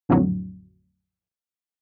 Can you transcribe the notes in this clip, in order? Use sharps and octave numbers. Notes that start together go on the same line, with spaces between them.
A#1 F2 A2 D3 F#3